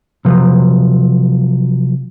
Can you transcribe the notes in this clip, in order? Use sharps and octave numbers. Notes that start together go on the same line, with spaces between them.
C3 F3 F#3